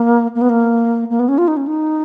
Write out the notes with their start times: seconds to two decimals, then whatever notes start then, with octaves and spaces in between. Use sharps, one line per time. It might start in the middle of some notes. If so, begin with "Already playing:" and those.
Already playing: A#3
0.35 A#3
0.41 B3
0.49 A#3
1.10 A#3
1.20 B3
1.28 C#4
1.38 F4
1.48 D#4
1.57 C#4
1.67 D#4